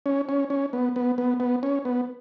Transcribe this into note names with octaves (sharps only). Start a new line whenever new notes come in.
C#4
C#4
C#4
B3
B3
B3
B3
C#4
B3